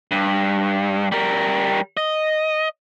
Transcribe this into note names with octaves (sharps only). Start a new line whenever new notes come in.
G2
G3 A#4
D#5